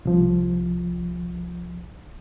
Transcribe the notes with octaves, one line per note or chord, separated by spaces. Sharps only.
C2 F3